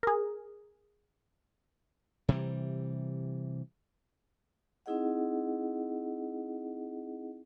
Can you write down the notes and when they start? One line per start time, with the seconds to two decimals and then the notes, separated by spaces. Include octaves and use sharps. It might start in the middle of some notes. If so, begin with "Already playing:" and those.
0.03 G#4 A#4
2.29 C3 E3 G3
4.86 C4 D#4 E4 G#4 D#5 F#5